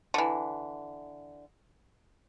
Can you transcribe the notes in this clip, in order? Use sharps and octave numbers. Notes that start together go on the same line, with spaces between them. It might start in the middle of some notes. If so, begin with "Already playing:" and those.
D3 E3